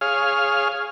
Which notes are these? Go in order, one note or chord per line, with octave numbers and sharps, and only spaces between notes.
G#4 C#5 F5 F6